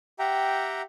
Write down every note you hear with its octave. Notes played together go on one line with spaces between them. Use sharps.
G4 E5 F#5 G5 A#5